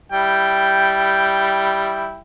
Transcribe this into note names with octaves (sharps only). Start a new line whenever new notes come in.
G3 E4 G5